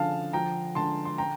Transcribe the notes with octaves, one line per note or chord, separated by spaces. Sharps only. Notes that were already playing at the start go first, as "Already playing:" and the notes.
Already playing: D3 F3 F5 A5
F3 G5 A#5
D3 A5 C6
C6
G5 A#5